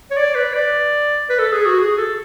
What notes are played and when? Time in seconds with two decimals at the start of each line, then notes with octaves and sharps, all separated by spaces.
0.11 C#5
0.17 D5
0.35 B4
0.53 D5
1.30 B4
1.39 A4
1.52 G#4
1.66 F#4
1.79 G#4
1.98 A4